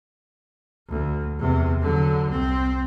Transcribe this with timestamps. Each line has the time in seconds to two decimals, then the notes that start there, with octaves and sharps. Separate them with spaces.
0.88 D2
1.39 E2 C3
1.81 D3 F#3
2.28 C2 C4